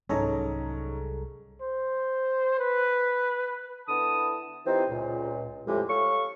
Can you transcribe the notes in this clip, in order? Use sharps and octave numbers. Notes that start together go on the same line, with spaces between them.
C2 G#2 F#3 G3 C#4 G#4 A4 A#5
C5
B4
D3 B3 E4 A5 D#6
E3 C4 D#4 F4 G4 C5
C#2 A#2
F2 A2 E3 G#3 G4
A4 C#5 F5 C#6